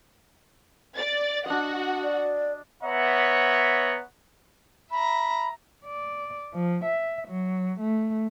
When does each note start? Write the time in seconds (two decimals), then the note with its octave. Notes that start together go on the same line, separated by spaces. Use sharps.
0.97 D5 A6
1.46 D4 F#4 D#5 F#5
2.03 D5
2.82 B3 C#5 E5 F#5 A#5
4.91 E5 A#5 B5
5.86 D5
6.54 F3
6.85 E5
7.28 F#3
7.80 A3